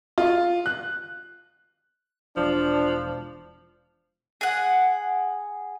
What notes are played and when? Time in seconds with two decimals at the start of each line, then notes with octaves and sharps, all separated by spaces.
0.18 F4
0.66 F#6
2.37 E1 F3 D4
4.41 G#4 F#5